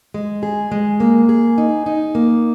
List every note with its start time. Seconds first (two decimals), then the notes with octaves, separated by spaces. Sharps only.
0.14 G#3
0.43 G#4
0.71 G#3
1.00 A#3
1.29 G#4
1.58 D#4
1.86 D#4
2.15 A#3